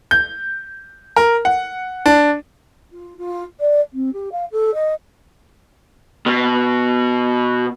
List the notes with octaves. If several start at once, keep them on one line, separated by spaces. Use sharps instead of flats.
G6
A#4
F#5
D4
F4
F4
D5
C4
G4
F5
A4
D#5
B2